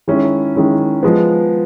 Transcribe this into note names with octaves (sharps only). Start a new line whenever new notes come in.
D#3 G#3 C#4 E4
D#3 G#3 C#4 E4
F3 G#3 B3